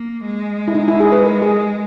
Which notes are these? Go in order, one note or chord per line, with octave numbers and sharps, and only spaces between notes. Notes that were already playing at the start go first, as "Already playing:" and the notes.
Already playing: A#3
G#3
E4
D#4
E4
G#4
B4
A#4
G#4